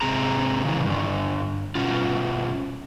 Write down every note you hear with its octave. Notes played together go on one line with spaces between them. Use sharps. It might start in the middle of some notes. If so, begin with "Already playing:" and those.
G#2 C3 C4 G#4 A#5
C#3 E3
G2 D3
B2 C#4 F4